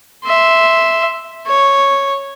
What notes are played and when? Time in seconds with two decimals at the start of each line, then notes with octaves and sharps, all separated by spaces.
0.24 E5 C6
1.46 C#5